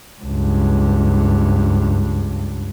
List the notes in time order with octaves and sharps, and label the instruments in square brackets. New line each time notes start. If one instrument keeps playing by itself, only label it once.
[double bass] C#2 G2